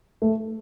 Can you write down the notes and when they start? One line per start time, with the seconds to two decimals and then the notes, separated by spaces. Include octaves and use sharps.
0.22 A3